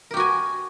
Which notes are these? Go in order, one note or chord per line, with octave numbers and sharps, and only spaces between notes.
F#4 G4 A#4 G#5